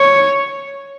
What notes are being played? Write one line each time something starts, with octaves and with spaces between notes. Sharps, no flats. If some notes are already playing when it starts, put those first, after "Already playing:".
Already playing: C#5